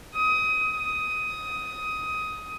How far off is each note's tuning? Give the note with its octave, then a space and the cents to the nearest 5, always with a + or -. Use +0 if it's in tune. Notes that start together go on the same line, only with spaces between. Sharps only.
D#6 +20
D#6 +15